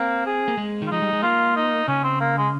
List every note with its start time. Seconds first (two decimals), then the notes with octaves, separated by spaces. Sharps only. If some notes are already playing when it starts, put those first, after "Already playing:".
Already playing: A#3 C4
0.26 G#4
0.48 A#3
0.57 G#3
0.82 D#3 F4
0.91 F3 D#4
1.02 G3
1.13 G#3
1.22 A#3 F4
1.56 D#4
1.88 C#3 C#4
2.03 C4
2.20 A#3
2.37 G#3